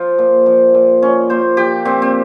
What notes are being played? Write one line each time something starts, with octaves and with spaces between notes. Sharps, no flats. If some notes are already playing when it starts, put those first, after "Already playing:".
Already playing: F3 F4
A#2
F3
A#2
A#2 C#4
A#2 C5
F3 G4
A#2 C4
C4